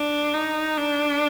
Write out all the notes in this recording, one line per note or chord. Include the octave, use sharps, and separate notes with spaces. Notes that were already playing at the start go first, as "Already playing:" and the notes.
Already playing: D4
D#4
D4